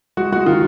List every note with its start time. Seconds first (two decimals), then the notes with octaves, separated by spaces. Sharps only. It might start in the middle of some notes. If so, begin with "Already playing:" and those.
0.17 G#3 F#4
0.32 G#3 F#4
0.46 D#3 F4